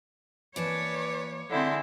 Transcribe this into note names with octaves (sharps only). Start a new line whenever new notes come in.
E3 A#3 B4 C#5 D5 A5
D3 G#3 C4 E4